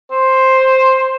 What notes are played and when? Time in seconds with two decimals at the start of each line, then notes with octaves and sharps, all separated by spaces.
0.11 C5